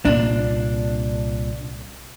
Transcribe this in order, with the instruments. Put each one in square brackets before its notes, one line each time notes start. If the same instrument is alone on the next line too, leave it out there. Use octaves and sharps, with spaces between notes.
[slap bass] C2 A#2 A#3 [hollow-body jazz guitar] D4